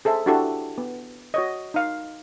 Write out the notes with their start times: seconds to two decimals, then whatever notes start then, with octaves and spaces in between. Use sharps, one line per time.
0.05 G#4 A4 C5 E5
0.26 D4 E4 F#4 G4 A4
0.78 B3
1.34 F#4 C#5 D#5
1.74 D#4 F5